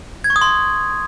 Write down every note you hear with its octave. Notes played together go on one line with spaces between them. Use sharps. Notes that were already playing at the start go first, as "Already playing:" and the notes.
G#6
C#6
D#6
C6